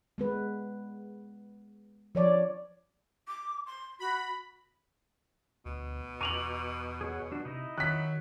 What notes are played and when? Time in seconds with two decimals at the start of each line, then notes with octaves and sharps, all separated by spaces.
0.18 G#3 B3 B4
2.15 F3 C#5 D5
3.28 D6
3.66 C6
4.00 F#4 B5
5.66 D2 B2
6.21 E2 A#5 C#6 D6 D#7 F7 F#7
7.01 G#4 C#5 F#5
7.32 D4 F#4
7.45 C3 D#4 E4 D#5
7.78 D#3 F#3 F#6 B6